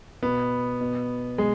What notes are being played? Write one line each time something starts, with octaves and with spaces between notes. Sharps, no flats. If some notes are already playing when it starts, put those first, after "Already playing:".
B2 B3
B2
B2 G#3